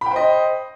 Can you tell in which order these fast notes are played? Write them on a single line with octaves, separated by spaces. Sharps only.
B5 G5 C5 D#5